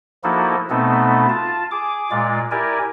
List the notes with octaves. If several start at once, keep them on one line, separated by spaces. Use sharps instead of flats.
F3 A#3 D#4 E4 F#4 A4
B2 A3 B3 C4 D#4 A4
F4 A5
G#4 D6
A#2 G#3 F4 D5
E4 G4 A#4 D5 G#5